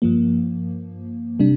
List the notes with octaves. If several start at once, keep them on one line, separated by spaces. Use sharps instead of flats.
G2 F3 A#3
C3 G3 D4